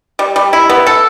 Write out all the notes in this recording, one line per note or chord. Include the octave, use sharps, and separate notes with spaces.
G3
G3
E4
B3
A4